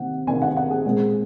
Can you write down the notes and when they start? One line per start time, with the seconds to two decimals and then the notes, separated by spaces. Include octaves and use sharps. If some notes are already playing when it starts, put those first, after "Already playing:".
Already playing: C3 D#3 A#3 F#5
0.27 C3 D#3 A#3 G#5
0.42 F#5
0.57 F#5
0.70 G#4
0.85 A#2 G#3 C4